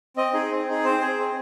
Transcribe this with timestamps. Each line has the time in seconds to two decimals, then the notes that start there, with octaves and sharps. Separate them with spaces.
0.17 C4 D#5
0.34 D#4 G#4
0.51 C4
0.68 D#4 G#4
0.84 C4 C5
1.01 G#4
1.18 C4